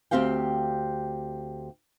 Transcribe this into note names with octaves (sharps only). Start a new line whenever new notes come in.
D2 A#3 C4 G4 F5 G5